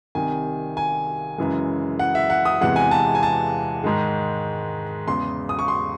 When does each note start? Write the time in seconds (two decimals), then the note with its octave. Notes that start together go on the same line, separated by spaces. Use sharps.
0.15 C2 C3 D#3 G#5
0.77 G#5
1.38 F#2 C#3 E3 G#3
1.99 F#5
2.15 E5
2.30 F#5
2.45 D#6
2.61 E2 C3 E3 G#3 F#5
2.76 G#5
2.91 A5
3.15 G#5
3.23 A5
3.84 G#2 D#3 G#3
5.07 E2 C#3 G#3 C6
5.49 D#6
5.59 C#6
5.68 C6